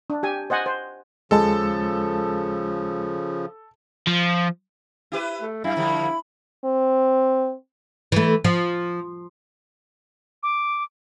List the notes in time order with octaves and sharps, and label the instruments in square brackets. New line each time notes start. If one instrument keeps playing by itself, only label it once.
[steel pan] D4
G4 G#5
C5 D#5 F#5 G#5
C5
[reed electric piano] D#2 G#3 [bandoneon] C#3 F3 [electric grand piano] A4 A5
[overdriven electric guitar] F3
[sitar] E4 G4 B4
[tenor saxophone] A3
[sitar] F#2 [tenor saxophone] E4 [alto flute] F5
[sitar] D3 F3 G3 [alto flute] B5
[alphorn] C4
[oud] E3 A3
F3
[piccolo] D6